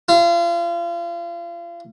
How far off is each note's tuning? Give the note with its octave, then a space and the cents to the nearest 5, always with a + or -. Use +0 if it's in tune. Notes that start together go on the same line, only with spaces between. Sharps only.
F4 -35